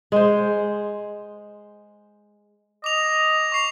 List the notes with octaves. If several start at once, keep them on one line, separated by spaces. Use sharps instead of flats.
G#3 C5
D#5 D6 F7
C#6 C7 F7